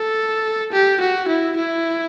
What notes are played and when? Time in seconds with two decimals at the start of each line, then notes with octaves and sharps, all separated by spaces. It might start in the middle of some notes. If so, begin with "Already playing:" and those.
Already playing: A4
0.72 G4
1.00 F#4
1.28 E4
1.57 E4